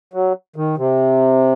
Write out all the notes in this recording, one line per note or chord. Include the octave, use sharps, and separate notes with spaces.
F#3
D#3
C3